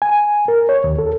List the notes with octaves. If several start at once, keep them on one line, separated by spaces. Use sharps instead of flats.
G#5
A#4
C#5
D#2
A4